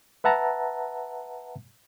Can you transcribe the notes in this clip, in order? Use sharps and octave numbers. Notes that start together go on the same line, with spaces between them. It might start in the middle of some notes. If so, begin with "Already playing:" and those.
B4 E5 F#5 A5 A#5